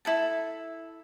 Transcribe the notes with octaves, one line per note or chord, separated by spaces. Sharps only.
E4 A4 A5